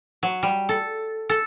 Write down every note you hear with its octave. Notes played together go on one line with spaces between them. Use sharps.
F#3
G3
A4
A4